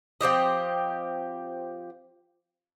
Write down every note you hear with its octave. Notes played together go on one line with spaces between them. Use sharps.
F3 C4 G4 D#5